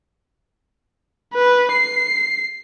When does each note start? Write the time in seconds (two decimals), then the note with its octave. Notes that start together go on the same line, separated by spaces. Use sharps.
1.35 B4
1.73 C7